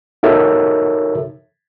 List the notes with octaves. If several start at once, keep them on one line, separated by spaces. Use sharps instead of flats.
D#4 F#4 A4 A#4 C#5 E5